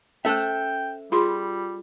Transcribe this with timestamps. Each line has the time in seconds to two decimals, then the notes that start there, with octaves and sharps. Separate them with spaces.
0.25 C#4 A4 C5 E5 G5
1.12 G3 F4 G#4 C6